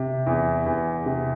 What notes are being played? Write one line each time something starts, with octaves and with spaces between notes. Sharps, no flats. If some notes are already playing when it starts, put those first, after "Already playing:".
Already playing: C3
E2
E2
C3